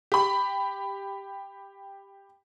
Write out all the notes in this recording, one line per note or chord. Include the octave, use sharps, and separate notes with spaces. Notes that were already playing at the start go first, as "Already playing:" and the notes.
G4 B5